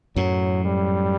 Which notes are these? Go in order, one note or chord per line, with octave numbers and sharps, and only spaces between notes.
F#2 A2 F#3
G3